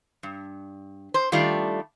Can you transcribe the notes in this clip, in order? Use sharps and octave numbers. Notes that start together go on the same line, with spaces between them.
G2
C5
D#3 G3 A3 D4 F4 D5